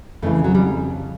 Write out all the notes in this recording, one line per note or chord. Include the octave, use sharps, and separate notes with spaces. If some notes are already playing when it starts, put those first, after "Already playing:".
F2 C#3 E3 A3
F#3
G3